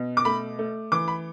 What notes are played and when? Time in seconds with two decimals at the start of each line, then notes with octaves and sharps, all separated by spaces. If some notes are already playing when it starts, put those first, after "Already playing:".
Already playing: B2
0.17 D6
0.25 A3 B5
0.59 A3
0.92 E3 D6
1.08 B5